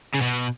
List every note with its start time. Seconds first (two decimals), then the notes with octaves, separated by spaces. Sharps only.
0.15 C#3
0.22 B2